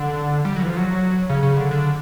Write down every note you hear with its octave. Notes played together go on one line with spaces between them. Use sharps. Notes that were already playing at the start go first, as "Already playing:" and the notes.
Already playing: D3
G3
F#3
E3
F3
F#3
C#3
C#3
D3
D3